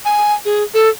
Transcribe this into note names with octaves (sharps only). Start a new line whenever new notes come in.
G#5
G#4
A4